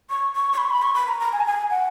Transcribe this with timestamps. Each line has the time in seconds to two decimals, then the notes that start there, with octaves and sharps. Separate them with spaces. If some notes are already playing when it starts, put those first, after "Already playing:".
0.10 C#6
0.36 C#6
0.52 C#6
0.58 B5
0.64 C#6
0.70 B5
0.82 C#6
0.94 B5
1.07 A#5
1.20 A#5
1.33 G#5
1.41 A#5
1.47 G#5
1.71 F#5